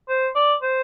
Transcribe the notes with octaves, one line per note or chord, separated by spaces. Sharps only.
C5
D5
C5